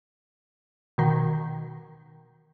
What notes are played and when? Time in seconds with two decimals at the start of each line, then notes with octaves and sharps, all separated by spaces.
0.98 B2 D#3